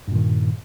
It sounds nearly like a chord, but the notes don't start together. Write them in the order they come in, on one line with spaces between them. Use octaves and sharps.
G2 A#2 D#3